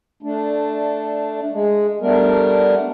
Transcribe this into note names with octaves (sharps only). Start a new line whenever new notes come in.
A3 D4
G#3
G3 A3 B3 D4 A#4